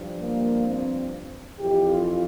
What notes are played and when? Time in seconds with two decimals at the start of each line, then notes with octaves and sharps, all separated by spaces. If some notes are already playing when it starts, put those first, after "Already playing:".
Already playing: G2 F3
0.21 A#3
0.66 C4
1.59 F2 E3 G4
1.90 F4